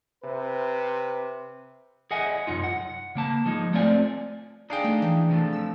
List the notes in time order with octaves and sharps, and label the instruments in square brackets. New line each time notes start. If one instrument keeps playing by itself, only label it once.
[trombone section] C3 B4
[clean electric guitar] G#4 D#5 E5 F#5 G#5
C2 F#2 D#4 F4
F#5
C#3 A#3 A5
F3 G#3 D#4
A3 C4 F4 D5 E5 G#5
[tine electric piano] D4 G#4 [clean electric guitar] D#4 F5 G5
[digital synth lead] A3
E3
[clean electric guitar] C3 F3 A3
[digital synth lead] E6